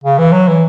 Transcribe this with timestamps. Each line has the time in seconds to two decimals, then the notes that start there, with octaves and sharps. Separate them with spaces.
0.04 C#3
0.19 E3
0.32 F#3
0.48 E3